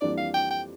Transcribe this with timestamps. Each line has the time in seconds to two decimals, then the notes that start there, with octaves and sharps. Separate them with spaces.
0.01 F2 E3 G3 A#3 D4 D5
0.17 F5
0.34 G5
0.51 G5